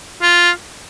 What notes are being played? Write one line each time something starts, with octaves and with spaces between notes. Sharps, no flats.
F4